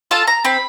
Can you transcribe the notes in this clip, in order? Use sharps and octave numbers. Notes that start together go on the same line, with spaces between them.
F4 A4 A5
A#5
C4 B5